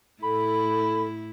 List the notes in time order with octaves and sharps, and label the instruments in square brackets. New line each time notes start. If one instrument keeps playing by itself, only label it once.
[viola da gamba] A2 E4 [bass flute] A4 [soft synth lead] B5